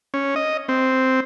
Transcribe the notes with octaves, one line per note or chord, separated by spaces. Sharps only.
C#4
D#5
C4